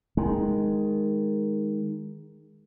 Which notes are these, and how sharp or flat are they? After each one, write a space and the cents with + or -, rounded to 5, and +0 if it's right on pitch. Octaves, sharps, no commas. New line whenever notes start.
D#3 +0 G#3 +0